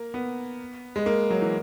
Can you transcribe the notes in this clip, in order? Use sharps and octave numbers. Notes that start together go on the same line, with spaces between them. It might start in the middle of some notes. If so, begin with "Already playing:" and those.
Already playing: A#3
B3
G#3
A#3
F#3
E3